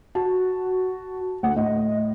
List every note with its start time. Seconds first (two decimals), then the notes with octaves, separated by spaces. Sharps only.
0.15 F#4 A5
1.43 D2 F#5
1.56 A2 D#5